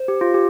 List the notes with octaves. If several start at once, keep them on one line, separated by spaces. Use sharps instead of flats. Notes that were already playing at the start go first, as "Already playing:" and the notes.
Already playing: C5
G4
F4
G4